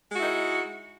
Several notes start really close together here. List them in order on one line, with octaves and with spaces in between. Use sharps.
G#3 F#4 E4 D#4